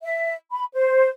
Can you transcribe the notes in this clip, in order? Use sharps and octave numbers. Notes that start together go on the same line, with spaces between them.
E5
B5
C5